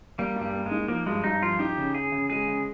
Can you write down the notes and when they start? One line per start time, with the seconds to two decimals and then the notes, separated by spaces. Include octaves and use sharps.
0.18 G3 A#3
0.36 G2
0.41 G3
0.53 A#3
0.66 G#3
0.71 D#4
0.88 F3 A#3
1.06 G2 G#3
1.24 G2 D#4
1.42 F3 F4
1.59 D#4 G4
1.77 C#3
1.94 C#3 G#4
2.12 C#3
2.30 G#3 G#4
2.48 C#3